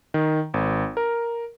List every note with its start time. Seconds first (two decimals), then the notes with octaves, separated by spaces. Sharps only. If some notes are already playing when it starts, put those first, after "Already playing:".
0.14 D#3
0.54 G#1
0.97 A#4